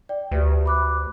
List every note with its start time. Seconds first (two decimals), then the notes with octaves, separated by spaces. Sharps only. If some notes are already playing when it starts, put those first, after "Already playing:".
0.09 D5 G5
0.31 D2 G4 B4
0.66 B5 D6 F#6